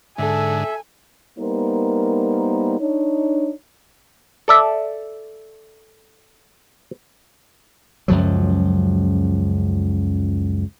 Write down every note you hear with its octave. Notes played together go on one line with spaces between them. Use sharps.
G#2 D3 A4 E5 G#5
G3 A#3 B3 D#4 A#4 C5
D4 D#4 C#5
A4 D5 E5
C#2 F#2 F3 F#3